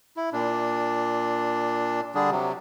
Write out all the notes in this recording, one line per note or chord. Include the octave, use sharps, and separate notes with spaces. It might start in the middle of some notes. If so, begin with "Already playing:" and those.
E4
A#2 D4
D3 G3 D4 G#4
C3 F#3